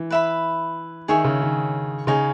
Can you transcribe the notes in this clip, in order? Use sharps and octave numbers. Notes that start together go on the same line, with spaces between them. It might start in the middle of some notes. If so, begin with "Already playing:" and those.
Already playing: E3
B4 E5 B5
D#3 G#4 C#5 E5 G#5
C#3
D#3
C#3 D#4 G#4 C#5